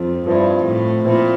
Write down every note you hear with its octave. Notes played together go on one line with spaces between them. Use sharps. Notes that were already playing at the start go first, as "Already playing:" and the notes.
Already playing: F2 F3 C4
G2 F3 C4 E4
A2
A#2 F3 C4 E4